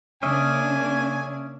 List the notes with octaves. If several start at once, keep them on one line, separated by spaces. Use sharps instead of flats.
C#3 A#3 C#4 D4 D#5 E5 G#5